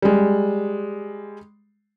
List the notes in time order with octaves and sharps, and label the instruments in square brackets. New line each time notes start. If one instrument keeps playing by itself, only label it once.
[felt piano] G3 G#3